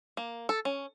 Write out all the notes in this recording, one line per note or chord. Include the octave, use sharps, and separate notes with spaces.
A#3
A4
C#4